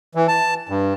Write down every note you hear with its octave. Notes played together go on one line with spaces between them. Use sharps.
E3
A5
G2